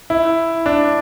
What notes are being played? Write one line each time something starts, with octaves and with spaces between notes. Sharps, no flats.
E4
D4